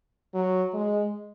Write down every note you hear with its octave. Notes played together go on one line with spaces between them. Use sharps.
F#3
G#3